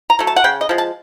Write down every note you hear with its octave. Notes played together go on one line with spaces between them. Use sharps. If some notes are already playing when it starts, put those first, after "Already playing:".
A#5
F#3 A3
A5
F#5
C#3 G5
D#5
F3 G#3
A5